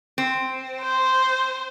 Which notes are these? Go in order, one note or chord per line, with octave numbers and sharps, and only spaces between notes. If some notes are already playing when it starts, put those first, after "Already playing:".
C4
C5